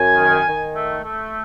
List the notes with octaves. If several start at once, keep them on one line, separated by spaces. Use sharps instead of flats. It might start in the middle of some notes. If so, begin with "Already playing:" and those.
Already playing: F#2 G#5
D#3
D#3
A3
A3